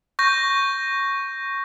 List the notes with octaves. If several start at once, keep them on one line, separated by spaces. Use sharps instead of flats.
C#6 G6 A#6